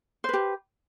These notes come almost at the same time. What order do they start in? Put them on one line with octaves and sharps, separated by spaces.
C5 B4 G4